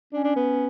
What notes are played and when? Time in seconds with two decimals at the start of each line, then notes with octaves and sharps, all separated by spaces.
0.13 C#4 D4
0.24 D4
0.36 B3